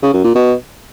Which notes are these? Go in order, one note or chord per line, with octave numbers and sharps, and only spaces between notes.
C#3
F#2
A#2
B2